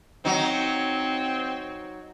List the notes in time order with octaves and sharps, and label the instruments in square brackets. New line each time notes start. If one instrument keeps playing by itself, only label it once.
[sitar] F#3 D#4 [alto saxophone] C4